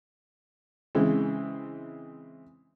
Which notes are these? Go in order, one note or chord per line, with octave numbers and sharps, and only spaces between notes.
C#3 E3 G#3 C4